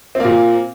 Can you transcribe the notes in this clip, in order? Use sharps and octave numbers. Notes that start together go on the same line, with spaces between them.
A#2 A#3 C4